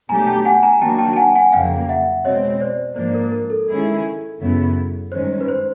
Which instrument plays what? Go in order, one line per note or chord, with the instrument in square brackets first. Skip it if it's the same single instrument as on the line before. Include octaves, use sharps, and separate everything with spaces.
[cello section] B2 F#3 A3 D4 G4 [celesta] G#5 A#5
[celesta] G5 A5
F#5 G#5
G#5 A#5
[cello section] D#3 F#3 A#3 D4 F#4 [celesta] G5 A5
[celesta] G5 A5
A5
F#5 G#5
F#5 G#5
[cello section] F2 C#3 F#3 A#3 [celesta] F5 G5
[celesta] E5 F#5
[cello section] B2 G#3 C4 [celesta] C#5 D#5
[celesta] C5 D5
[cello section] G#2 F3 A#3 D4 [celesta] C5 D5
[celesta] A#4
A#4
A4
[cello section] D#3 G#3 C#4 E4 G#4
F#2 C#3 F#3 B3 E4
[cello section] G2 D#3 G#3 C#4 [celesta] C5
[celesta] B4
C5